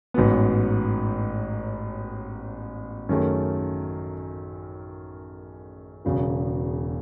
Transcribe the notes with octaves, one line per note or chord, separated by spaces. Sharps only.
A1 G#2 F#3 B3
F#2 D#3 A3 C#4 G#4
E1 E2 C#3 F#3